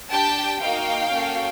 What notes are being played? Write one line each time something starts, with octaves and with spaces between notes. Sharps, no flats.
D4 G4 G5 A5
A#3 D#4 F#4 F5 G5
A#3 C#4 F#4 A4